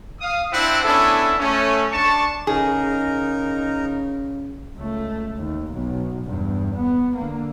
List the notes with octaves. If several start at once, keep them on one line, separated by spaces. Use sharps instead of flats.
F5 D#6
C4 D4 E4 C5 E5 F#5
B3 C#4 D4 E4 G#4 A4
A3 C#4
D4 A5 C#6
C#3 D#4 G#4 A#4
C#2 A3
D#2
B1 B2
E2 G2
B3
D3 A#3